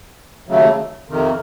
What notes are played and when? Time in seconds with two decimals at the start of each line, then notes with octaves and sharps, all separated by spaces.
0.48 D#2 C#3 F#3 A3
1.09 F2 C3 D#3